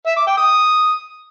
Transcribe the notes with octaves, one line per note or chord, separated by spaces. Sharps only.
E5
D6
G5
D#6